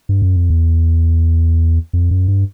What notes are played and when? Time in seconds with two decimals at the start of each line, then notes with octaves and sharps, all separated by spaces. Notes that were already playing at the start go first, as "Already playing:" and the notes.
0.09 G2
0.22 F#2
0.36 F2
0.50 E2
1.93 F2
2.11 F#2
2.28 G2